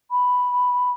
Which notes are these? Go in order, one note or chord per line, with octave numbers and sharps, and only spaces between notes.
B5